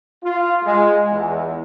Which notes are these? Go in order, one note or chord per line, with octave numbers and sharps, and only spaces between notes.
F4
G#3
E2